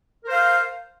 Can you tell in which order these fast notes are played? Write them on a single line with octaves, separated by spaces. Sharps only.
A#4 C5 F5